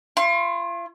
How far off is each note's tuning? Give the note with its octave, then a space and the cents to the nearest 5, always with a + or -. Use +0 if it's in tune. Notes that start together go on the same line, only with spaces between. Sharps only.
F4 -40 C6 +40